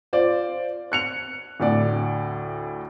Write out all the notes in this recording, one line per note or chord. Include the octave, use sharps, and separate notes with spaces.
F4 C5 D5
F#6 C#7 F7
D2 A2 D5